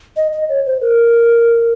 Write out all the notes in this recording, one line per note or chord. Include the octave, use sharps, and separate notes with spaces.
D#5
D#5
C#5
C5
A#4